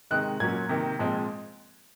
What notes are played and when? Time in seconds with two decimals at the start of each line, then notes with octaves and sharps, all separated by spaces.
0.11 C3 D#3 G#3 C4 F#6
0.40 A#2 F#3 A#3 C#4 G#6
0.69 C3 D#3 A#3
0.99 A#2 F3 G#3 C4